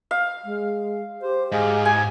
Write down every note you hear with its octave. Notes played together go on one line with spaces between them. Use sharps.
F5
G#3
G4 C5
G#2 G#4 D#5 F5
G#5